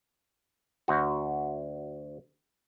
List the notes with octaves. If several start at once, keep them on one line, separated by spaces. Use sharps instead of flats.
D2 F#4